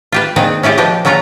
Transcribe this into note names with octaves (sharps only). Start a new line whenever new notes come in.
F4 G4 B4
A#2 D#3 C4 G#4 B4 G5
C#4 E4 F4 G4 G#4
F3 G4 B4 D#5
A#2 F#3 C#4 F4 A#5